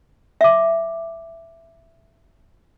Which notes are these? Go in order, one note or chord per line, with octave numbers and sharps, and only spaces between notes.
E5 D6